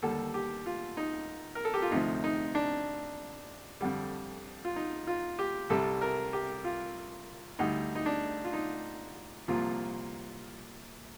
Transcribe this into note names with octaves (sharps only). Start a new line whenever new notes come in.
D#2 D3 G3 A4
G4
F4
D#4
A#4
A4
G4
F4
D2 C3 F3 D#4
D#4
D4
F2 D3 G3
F4
D#4
F4
G4
C2 C3 G3 A4
A#4
G4
F4
D2 D3 G3 D#4
D#4
D4
F4
D#4
C2 A#2 F3 F4